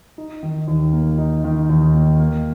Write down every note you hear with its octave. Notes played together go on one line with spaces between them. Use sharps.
D#4
D#3
D#2
A#3
D#4
D#3
D#2
A#3
A#3